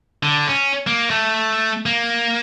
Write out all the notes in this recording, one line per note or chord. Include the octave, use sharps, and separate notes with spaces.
D3
C#4
A#3
A3
A#3